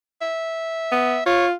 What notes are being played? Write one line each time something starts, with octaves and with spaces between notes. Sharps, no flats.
E5
B3
F4 C#5